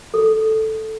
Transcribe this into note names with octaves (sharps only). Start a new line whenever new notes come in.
A4